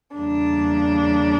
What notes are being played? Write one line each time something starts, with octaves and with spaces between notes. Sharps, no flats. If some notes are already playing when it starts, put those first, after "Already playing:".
E2 C#3 G3 A#3 D4